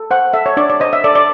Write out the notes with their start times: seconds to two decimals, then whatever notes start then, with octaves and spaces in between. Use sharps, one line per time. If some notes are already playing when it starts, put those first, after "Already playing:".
Already playing: A4
0.11 C5 F#5
0.33 A4 E5
0.46 C#5
0.57 D4 D5
0.70 D5
0.80 C5 D#5
0.93 E5
1.04 A4 D5
1.15 D5